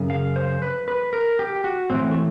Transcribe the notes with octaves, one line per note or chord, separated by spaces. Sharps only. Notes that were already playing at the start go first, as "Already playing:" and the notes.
Already playing: F#2 C#3
F5
C5
B4
B4
A#4
G4
F#4
A2 E3 C4
A3